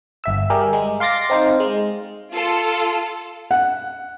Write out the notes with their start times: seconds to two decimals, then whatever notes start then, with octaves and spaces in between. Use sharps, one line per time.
0.24 G1 E5 E6
0.50 G3 G4 G#4 A#4
0.73 G#3
1.00 F5 C6 D6 A6 A#6
1.30 C4 D#4 C5 F5
1.60 G#3
2.31 F4 A4
3.51 F#5